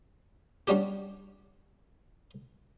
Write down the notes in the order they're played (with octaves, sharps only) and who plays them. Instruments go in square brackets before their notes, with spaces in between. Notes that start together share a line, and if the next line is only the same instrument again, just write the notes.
[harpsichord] G3 C#4 D4 F#4 G4